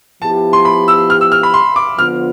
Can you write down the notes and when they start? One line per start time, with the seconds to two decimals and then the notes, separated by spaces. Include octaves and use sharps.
0.21 F3 B3 E4 G4 A5
0.53 C6
0.65 B5
0.88 E6
1.10 F6
1.21 E6
1.32 F6
1.43 B5
1.54 C6
1.76 D6
1.99 D3 F3 B3 F4 F6